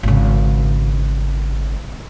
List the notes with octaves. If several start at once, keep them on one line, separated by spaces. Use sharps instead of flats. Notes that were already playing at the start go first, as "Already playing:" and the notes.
G#1 C#3